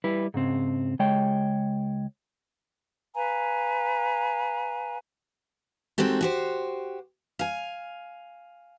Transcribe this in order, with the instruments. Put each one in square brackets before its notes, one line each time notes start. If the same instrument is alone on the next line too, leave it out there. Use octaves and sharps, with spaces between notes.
[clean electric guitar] G3 E4 B4
G#2 C#3 C4
C#2 G#3 C#5 G5
[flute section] B4 F5 G#5 A#5
[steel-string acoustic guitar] G#3 C4 D#4 F#4 G4 A4
F#4 G4 C5
F5 G#5